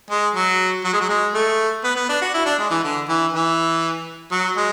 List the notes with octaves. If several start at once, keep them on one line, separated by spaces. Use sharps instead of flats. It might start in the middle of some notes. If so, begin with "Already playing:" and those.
G#3
F#3
F#3
G#3
F#3
G#3
A3
B3
B3
D4
F#4
E4
D4
G#3
E3
D3
E3
E3
F#3
G#3